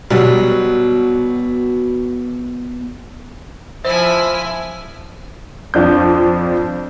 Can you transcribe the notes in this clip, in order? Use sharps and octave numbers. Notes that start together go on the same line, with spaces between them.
B2 F#3 G3
F3 E4 C5 E5 G#5
F2 F3 D4 G6